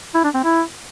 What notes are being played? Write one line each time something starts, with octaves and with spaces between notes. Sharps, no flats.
E4
D4
C4
E4